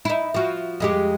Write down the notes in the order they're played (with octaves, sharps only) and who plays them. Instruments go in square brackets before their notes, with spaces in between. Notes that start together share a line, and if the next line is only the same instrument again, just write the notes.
[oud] D#4 E4
F3 F#4
F2 G#3 G4